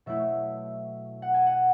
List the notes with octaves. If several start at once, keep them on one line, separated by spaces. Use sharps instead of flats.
B2 F#3 A3 E4 E5
F#5
G#5
F#5